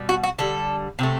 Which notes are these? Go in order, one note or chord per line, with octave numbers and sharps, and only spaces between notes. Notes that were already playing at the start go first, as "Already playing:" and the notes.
Already playing: B2 G3
F#4
F#4
D3 G3 A4
C3 F#3 A3